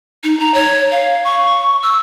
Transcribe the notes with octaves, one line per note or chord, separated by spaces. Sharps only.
D#4
A#5
C#5
F5
C#6
E6